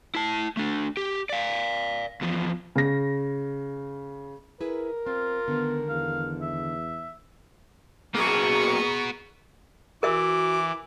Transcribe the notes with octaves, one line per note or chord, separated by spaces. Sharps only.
E4 A5
A3 D4
G4
D5 F5
E2 F3
C#3 A#6
E4 G#4 A#4 B4
C4 F4
D3 D#3 G#3 B3
E2 F5
E5
F#3 A#3 B3 F#4 G#4 A#5 C#6
E3 F#4 A#4 E5 D6 E6